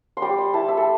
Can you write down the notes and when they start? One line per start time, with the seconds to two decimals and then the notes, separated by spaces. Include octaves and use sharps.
0.17 C6
0.22 G3 D6
0.38 C6
0.54 E4 A5
0.68 E5
0.77 A4